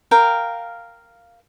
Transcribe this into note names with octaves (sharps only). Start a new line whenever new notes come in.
A#4 F5 G5